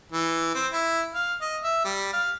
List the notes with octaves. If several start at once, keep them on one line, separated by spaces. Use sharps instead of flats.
E3
C4
E4
F5
D#5
E5
G3
F5